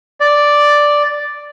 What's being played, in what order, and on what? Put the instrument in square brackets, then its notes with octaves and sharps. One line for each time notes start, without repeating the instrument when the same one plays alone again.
[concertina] D5